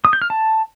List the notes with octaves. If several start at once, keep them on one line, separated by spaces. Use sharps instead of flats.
D#6
G6
F6
A5